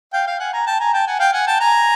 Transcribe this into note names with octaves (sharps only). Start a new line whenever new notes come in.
F5 G5
F5 G5
F#5 G#5
G#5 A#5
G5 A5
G#5 A#5
G5 A5
F#5 G#5
F5 G5
F#5 G#5
G5 A5
G#5 A#5